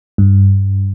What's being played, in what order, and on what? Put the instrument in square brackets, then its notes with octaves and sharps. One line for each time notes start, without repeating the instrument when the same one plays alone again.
[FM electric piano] G2